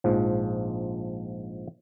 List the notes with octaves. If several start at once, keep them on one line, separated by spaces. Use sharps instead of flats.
A#1 G#2 F3